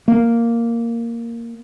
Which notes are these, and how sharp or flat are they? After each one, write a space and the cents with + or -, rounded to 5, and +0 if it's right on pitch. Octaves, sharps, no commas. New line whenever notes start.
A#3 -5